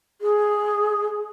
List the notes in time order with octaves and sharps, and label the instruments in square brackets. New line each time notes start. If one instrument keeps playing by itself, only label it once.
[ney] G#4